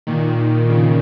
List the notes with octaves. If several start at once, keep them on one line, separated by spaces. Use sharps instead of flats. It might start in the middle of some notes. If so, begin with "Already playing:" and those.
A#2 D#3
C#3